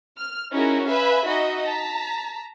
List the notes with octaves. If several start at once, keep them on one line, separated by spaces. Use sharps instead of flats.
F6
C#4 D#4 E4 F#4 G#4 A#4
B4 E5 F5 G#5 B5
D#4 F#4 D#5 E5
A5 A#5 B6